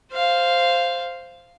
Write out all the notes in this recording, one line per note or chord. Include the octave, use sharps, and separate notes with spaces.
C5 F5